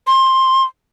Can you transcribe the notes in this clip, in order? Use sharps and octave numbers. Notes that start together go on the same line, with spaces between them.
C6